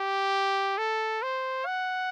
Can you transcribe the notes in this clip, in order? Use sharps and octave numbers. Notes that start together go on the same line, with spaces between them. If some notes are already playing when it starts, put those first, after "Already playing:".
Already playing: G4
A4
C5
F#5